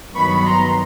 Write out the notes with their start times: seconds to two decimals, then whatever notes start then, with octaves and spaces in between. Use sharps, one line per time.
0.14 G2 D#3 F#3 B3 B5 C#6
0.46 A#5 C6